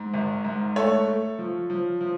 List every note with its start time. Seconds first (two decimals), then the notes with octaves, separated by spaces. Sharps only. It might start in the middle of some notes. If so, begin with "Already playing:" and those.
Already playing: G#2
0.14 G#1
0.45 G#2
0.76 A3 A4 C#5
1.07 A3
1.39 F3
1.70 F3
2.01 F3